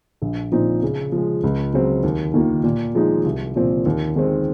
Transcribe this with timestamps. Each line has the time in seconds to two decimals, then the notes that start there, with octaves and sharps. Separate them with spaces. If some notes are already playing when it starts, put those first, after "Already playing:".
0.22 A#1
0.52 A#2 F3 C4 D#4
0.83 C#3
1.12 F3 G#3
1.44 C#2
1.74 C#3 F#3 C4
2.03 D#2
2.34 D#3 A#3 F4
2.64 A#2
2.95 F3 G#3 D#4
3.25 C2
3.56 A#2 F3 C4
3.86 D#2
4.16 D#3 G#3 C4